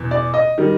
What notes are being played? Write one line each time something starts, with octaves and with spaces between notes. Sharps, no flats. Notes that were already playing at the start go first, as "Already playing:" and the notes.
Already playing: E2 B2
D5
D#5
D#3 G3